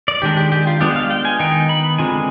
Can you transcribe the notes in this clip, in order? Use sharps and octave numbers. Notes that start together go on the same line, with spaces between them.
D5
D#3 G#3 D4 G4
G4
G4
F4
G#3 B3 D4 F4 G4
F5
G5
G#5
D#3 B3 D#4 G5
B5
D3 G#3 C4 F4 G#5